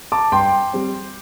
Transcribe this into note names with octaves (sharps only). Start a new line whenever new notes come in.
A5 D6
G2 G5 C6
G3 C4